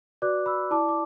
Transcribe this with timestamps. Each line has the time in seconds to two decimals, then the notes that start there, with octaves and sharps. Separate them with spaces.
0.22 F#4 B4 D5 D6 F#6
0.46 B5 E6
0.71 E4 D5 A5 D6
0.89 D6